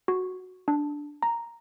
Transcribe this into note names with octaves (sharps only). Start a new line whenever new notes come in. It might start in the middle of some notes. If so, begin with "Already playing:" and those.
F#4
D4
A#5